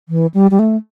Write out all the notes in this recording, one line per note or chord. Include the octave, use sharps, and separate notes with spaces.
E3
G3
G3
A3